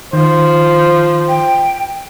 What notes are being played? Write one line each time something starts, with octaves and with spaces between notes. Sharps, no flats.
D#3 F3 C5
G5